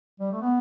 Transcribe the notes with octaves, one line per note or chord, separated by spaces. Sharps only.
G3
A3
B3